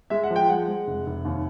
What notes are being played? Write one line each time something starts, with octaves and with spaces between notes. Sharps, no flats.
G#3 E5
F#5
F3
G5
G#3 F#5
G#3
F1
F1
D#2